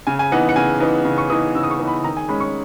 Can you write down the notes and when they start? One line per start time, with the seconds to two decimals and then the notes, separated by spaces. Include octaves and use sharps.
0.07 C#3 G#5
0.19 G#5
0.32 E3 B3 D#4 F#5
0.49 F#5
0.56 C#3 G#5
0.80 E3 B3 D#4
1.05 C#3
1.18 C#6
1.30 E3 B3 D#4 D#6
1.55 C#3 E6
1.64 D#6
1.71 C#6
1.79 E3 B3 D#4
1.87 B5
2.04 D#3 A#5
2.17 G#5
2.29 G#3 C#4 B5
2.40 C#6